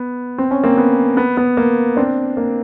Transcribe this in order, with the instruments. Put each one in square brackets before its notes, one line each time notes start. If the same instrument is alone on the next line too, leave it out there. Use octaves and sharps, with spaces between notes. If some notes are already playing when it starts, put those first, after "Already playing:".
Already playing: [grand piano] B3
C4
C#4
A#3 C4
B3
B3
B3
A#3
C4 D4
A#3